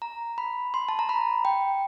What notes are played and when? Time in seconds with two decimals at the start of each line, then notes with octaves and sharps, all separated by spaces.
0.02 A#5
0.38 B5
0.74 C6
0.89 A5
0.99 A#5
1.09 B5
1.45 G5